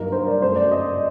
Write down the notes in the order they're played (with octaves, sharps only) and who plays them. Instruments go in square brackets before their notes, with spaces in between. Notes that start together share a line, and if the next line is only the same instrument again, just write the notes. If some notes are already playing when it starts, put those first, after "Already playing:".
Already playing: [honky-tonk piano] G2 F#3 A#3 D#4 A#4
C5
D5
F#2 F#3 A3 C5
D5
D#5